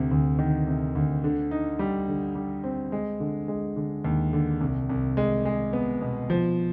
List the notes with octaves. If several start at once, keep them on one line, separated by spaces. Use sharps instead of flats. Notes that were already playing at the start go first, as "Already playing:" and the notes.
Already playing: D2 C3
D2
D#3
C3
D2
D3
D#4
G3
D3
G3
C4
G#3
D3
G#3
D3
D#2
D3
C2
C2
G#3
G#3
B3
B2
F3